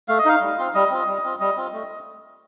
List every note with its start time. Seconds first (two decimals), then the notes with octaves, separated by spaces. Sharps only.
0.08 A3 F5
0.19 D#5
0.25 D#4 F5
0.41 G3
0.58 C4 F4
0.74 G3 D#5
0.91 C4 F4
1.08 G3
1.24 C4 F4
1.40 G3 D#5
1.57 C4 F4
1.73 A3